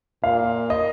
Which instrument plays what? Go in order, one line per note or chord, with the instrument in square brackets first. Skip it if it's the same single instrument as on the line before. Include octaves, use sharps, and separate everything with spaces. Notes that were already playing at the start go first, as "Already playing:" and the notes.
[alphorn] A#2 [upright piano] F5
[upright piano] D#5